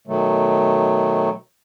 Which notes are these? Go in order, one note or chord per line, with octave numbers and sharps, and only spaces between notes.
B2 D#3 F#3 A3